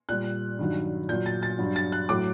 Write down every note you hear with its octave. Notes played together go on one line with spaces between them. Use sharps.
A#2 G3 F#6
G2 D#3 F#3
A#2 F#3 G6
A6
A6
G2 F#3
A6
F#6
A2 F#3 D6